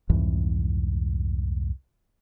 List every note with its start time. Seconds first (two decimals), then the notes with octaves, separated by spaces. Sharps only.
0.10 C2 F2 G#2 E3